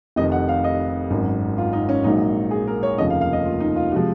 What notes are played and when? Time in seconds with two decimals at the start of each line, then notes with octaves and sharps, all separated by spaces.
0.16 F1 F2 C3 D#3 D#5
0.32 F#5
0.49 F5
0.64 D#5
1.10 G#1 F#2 D#3
1.58 F4
1.73 D#4
1.89 C#4
2.04 A#1 G#2 F#3 A#3 D#4
2.51 G#4
2.67 A#4
2.83 C#5
2.98 F1 D#2 C#3 F3 A#3 D#5
3.10 F5
3.21 F5
3.33 D#5
3.45 F4
3.60 D#4
3.76 F4
3.92 F#4
3.94 C3 F3 G#3